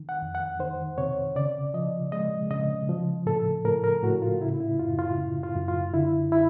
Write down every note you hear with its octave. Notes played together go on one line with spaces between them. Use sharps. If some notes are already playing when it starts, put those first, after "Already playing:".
Already playing: D#3
F#5
F2
F#5
D#3 C5
C3 C#5
C#3 D5
F3 D#5
G#3 D#5
C#3 D#5
F3
A2 A4
A2 A#4
A#4
A2 F#4
F4
C#3 E4
E4
F#2 F4
F4
C#3
F4
F#2
F4
D3 E4
E4